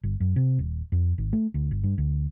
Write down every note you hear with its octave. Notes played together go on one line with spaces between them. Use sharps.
G1
F#2
C3
D#1
F2
G#1
A3
D2
G1
G2
D2